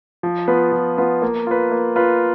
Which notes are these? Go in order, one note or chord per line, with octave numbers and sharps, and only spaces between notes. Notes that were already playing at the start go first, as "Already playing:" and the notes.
F3
B3 F4 B4
F3
B3 F4 B4
A#3
F4 B4
A#3
F4 B4